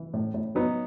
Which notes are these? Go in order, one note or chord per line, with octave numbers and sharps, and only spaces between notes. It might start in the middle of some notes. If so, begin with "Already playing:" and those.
Already playing: E3
A2
A2
F#3 B3 D#4